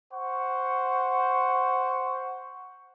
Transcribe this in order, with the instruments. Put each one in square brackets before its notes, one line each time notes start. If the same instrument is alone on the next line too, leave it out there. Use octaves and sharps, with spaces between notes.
[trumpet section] C5 F#5 C#6